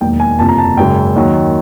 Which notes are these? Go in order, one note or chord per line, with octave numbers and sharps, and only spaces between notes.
E1 D#2 D#3 F#3 A#3 G5
G#5
F#1 F2 C3 A5
A#5
A5
G#1 F#2 C#3 G5
D#2 D#3 F#3